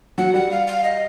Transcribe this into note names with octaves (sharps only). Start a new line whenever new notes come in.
F#3 F#5
G3 F#5
F5
F5
D#5